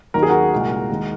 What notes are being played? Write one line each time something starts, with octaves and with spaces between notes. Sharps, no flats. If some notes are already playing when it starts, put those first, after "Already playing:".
D#2 D#3 F#3 A#4
G#4
F#4 A#4
C2 A#2 G#3
D#2 D#3 G#3